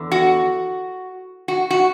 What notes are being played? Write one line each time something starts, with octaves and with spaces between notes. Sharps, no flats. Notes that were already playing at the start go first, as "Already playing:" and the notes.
Already playing: E2 D3
F#4
F#4
F#4